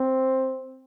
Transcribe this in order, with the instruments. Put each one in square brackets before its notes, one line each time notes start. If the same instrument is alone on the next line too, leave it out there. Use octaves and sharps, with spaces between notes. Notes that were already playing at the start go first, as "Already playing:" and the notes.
Already playing: [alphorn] C4